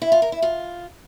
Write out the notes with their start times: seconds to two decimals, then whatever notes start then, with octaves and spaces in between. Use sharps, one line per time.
0.02 E4
0.12 F4
0.22 A#4
0.32 E4
0.42 F4